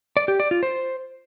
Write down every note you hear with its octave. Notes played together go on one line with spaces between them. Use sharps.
D5
G4
D5
F4
C5